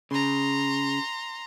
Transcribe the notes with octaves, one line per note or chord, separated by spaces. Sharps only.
C#3 A#5 C6